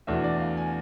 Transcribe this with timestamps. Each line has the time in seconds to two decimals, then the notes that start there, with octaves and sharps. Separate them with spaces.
0.07 E2 B2 A3 D4 E5
0.24 D5
0.40 F5
0.57 G#5